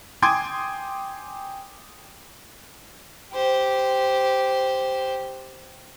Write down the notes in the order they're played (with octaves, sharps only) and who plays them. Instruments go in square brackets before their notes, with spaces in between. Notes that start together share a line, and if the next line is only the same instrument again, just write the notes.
[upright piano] G5 G#5 C6 D6 D#6 G#6
[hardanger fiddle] G4 C5